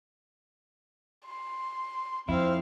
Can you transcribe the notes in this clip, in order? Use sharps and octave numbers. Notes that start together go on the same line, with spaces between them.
C6
F2 C4 E4 F5